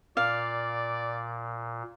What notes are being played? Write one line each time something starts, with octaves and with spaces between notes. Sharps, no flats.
A#2 D5 F5